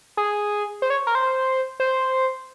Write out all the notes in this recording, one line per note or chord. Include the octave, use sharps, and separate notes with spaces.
G#4
C5
C#5
A#4
C5
C5